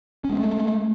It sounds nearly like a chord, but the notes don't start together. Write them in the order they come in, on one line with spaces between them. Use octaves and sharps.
C#4 G#3 C4 A3